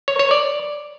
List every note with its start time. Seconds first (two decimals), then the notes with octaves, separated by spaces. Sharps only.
0.08 C#5
0.19 C#5
0.31 D5